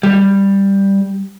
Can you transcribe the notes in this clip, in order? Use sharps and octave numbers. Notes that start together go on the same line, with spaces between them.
G3